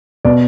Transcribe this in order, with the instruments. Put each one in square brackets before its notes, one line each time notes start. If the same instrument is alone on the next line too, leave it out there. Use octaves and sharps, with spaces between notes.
[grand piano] B2 D5